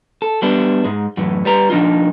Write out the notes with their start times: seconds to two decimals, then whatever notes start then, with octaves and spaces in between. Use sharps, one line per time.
0.22 A4
0.42 G3 B3 D4 E4
0.84 G#2 G#3
1.17 F#2 A2 E3
1.45 G3 B4 A#5
1.70 F3 D4 D#4 F4